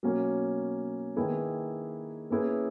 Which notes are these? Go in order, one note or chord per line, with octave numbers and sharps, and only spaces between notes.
B2 F#3 A#3 C#4
D#3 A#3 E4 G#4 B4
A#3 C#4 E4 G#4 B4